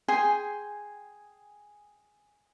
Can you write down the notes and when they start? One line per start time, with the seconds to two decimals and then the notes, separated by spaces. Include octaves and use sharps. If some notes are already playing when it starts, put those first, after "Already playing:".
0.08 G#4 G5 G#5 C6